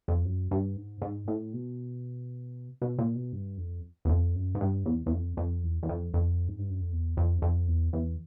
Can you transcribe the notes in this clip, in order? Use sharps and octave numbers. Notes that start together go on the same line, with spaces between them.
F2
F#2
G2
G#2
G#2
A2
B2
B2
A#2
B2
G2
F2
E2
F2
F#2
G#2
G2
E2
E2
F2
F2
E2
E2
F2
F2
G#2
G2
F#2
F2
E2
F2
F2
E2
E2